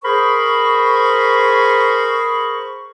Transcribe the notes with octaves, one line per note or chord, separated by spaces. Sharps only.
G#4 A#4 C5 B5 C#6